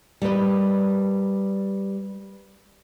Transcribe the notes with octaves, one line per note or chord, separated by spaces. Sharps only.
G3 A#4 B4 D#5